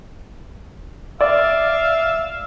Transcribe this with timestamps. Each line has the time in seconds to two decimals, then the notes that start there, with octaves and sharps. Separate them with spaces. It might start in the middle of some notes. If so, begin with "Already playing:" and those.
1.21 D5 E5 F5